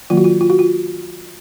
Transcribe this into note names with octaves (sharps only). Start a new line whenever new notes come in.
D#3 F#3 A#3 F4
F#4
F4
F4
F#4
F4